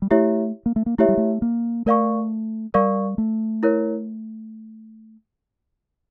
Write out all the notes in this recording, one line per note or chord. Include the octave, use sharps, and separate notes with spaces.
G3
A3 E4 G4 C#5 E5
A#3
A3
A#3
A3 E4 G4 C#5 E5
G3
A3
A#3
A3 A#4 D5 F5 C#6
G3 A#4 D5 F5 C#6
A3
E4 A#4 C#5